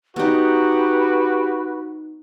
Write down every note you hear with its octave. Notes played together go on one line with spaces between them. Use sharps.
B3 D#4 F#4 G4 B4